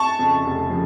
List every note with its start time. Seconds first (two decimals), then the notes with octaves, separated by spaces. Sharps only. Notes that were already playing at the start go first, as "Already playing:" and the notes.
Already playing: A5 C#6
0.19 F2 C#3 F3
0.45 F1
0.70 C#3 F3